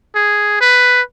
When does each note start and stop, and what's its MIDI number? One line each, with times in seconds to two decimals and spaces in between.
0.15 0.58 68
0.61 1.01 71